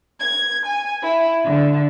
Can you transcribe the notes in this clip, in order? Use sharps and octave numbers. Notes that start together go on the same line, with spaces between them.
G#6
G#5
E4
D3